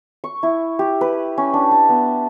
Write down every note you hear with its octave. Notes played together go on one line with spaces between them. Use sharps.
C#6
E4
G4
B4
C#4
D4
A5
B3